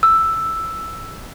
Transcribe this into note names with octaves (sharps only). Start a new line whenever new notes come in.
E6